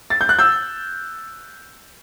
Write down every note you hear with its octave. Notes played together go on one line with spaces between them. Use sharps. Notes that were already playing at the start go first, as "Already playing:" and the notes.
A6
G6
F#6
E6 G6